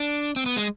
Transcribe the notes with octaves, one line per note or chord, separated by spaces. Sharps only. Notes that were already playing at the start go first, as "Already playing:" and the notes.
Already playing: D4
C4
B3
G#3